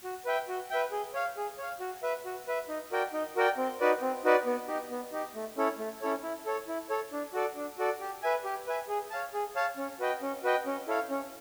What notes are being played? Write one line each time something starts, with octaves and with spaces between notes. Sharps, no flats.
F#4
B4 E5 G5
F#4
B4 E5 G5
G#4
C#5 F5
G#4
C#5 F5
F#4
B4 E5
F#4
B4 E5
D#4
F#4 A#4 D5 G5
D#4
F#4 A#4 D5 G5
C4
D#4 F#4 B4 D5
C4
D#4 F#4 B4 D5
B3
D#4 G4
B3
D#4 G4
A3
C#4 E4 A4 C#5
A3
C#4 E4 A4 C#5
E4
A4 C#5
E4
A4 C#5
D4
F#4 A4 D5
D4
F#4 A4 D5
G4
B4 E5 G#5
G4
B4 E5 G#5
G#4
C#5 F5 A5
G#4
C#5 F5 A5
C#4
F#4 B4 D#5 G5
C#4
F#4 B4 D#5 G5
C#4
E4 A4 C#5 F5
C#4